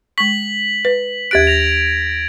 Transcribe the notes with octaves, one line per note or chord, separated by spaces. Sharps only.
G#3 C#6 B6 F#7
B4
D#2 G4 F#6 G#6 A6 D7
A#6 F7